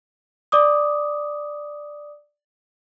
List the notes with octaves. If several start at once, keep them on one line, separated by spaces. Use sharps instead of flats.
D5 D6 D#6